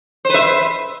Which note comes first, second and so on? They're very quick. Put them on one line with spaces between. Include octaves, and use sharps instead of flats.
C5 B4 E5